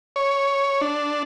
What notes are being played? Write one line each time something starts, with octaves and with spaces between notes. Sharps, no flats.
C#5
D4